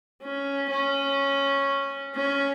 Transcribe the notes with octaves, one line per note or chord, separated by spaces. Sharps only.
C#4
C#4
C#4